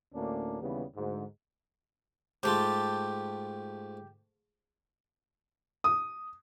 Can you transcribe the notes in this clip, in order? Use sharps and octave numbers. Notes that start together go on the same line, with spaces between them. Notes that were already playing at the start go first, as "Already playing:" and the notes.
D2 A2 A#3 C#4 D4
D#2 C#3 E3 G3 B3
D2 G#2
G#2 A3 F4 G4 A5
D#6